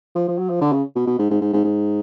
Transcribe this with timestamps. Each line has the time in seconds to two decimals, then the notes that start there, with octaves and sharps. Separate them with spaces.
0.15 F3
0.28 F3
0.38 F#3
0.50 F3
0.61 D3
0.73 C#3
0.96 B2
1.07 B2
1.19 G#2
1.30 G#2
1.41 G#2
1.53 G#2
1.64 G#2